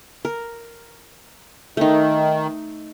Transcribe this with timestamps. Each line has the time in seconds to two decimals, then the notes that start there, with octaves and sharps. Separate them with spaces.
0.25 A#4
1.77 D#3 A3 D#4